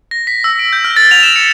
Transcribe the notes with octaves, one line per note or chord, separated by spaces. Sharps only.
A#6
B6
E6
D7
G6
F6
A6
F7
E7
C#7